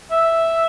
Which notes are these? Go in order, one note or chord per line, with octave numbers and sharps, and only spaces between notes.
E5